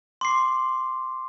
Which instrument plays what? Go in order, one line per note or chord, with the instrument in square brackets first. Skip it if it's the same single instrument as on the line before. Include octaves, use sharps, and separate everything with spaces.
[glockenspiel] C6 D6 C7